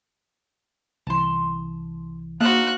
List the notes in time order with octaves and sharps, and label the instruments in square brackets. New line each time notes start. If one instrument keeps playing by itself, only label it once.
[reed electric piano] C2 E3 [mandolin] A5 C6
[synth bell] A#3 [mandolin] D4 D#4 C5 [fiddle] F#4 F#6 [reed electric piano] F5 F6